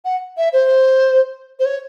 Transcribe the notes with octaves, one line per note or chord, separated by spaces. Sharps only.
F#5
E5
C5
C5
C#5